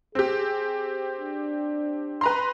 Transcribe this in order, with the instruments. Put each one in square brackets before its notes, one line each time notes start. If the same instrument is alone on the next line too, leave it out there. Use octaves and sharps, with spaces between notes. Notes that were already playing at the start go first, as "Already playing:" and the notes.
[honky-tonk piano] C4 G4 [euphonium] G#4
[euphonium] D4
[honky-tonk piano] B4 A#5 C6